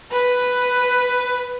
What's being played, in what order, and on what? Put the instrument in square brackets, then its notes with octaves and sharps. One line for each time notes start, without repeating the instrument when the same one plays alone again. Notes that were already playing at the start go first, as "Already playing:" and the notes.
[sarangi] B4